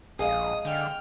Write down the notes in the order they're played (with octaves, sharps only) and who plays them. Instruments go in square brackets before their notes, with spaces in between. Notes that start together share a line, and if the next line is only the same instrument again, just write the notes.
[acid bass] A#1 [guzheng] G#3 [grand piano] G#4 F5 [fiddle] D#6
[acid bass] D3 [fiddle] G5 F6